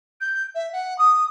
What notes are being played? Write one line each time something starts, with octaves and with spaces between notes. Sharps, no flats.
G6
E5
F#5
D#6